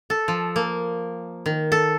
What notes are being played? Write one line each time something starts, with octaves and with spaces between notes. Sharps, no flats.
A4
F3
A#3
D#3
A4